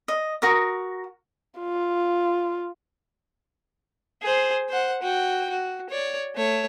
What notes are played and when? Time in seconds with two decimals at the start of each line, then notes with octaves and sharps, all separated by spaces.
0.08 D#5
0.42 F#4 A#4 C#6 D#6
1.59 F4
4.23 G#4 C5
4.69 C5 F#5
5.02 F#4 G5
5.50 F#4
5.90 C#5 D5
6.35 A3 C#5